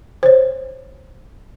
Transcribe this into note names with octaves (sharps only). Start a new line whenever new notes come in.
C5 C#5